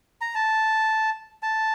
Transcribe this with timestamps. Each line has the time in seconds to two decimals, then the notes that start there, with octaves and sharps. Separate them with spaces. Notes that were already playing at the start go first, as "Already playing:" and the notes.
0.21 A#5
0.35 A5
1.43 A5